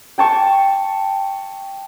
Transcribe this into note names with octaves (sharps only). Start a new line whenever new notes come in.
G5 A5 C#6